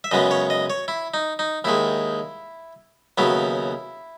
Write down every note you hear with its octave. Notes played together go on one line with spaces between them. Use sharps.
E5
F#2 C#3 G#3 B3 D#5
C#5
D#5
C#5
E4
D#4
D#4
D#2 D#3 G#3 E4
D#2 C#3 F#3 B3 E4